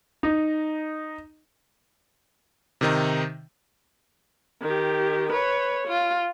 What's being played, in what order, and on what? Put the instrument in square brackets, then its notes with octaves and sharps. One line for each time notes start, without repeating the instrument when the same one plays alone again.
[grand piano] D#4
[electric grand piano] C3 D#3 D#4
[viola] D#3 G4
B4 C#5
F4